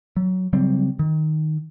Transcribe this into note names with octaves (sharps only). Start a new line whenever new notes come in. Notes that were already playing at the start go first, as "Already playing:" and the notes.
F#3
C#3 F#3 G3 C4
D#3